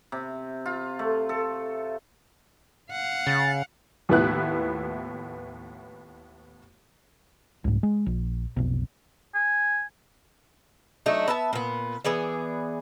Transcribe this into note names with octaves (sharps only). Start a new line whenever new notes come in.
C3
F4
A3
A4
F5 F#5
C#3 A6
D#2 A2 F3 B3 E4 F#6
C2 G#2
G#3
A#1
F1 B1
G#5
F#3 A3 D4 D#4
B3 E5 A5
A#2 B3
E3 B3 G#4 D5